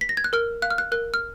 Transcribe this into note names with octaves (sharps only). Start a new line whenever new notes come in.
B6
A#6
G#6
F#6
A#4 F6
F5 F#6
F6
F#6
A#4 F#6
F6